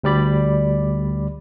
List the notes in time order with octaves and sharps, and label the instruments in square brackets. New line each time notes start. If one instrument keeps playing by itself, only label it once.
[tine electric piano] D2 G3 D5 B5